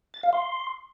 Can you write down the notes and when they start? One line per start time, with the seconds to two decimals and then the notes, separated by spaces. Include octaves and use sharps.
0.14 A6
0.23 F5
0.33 C6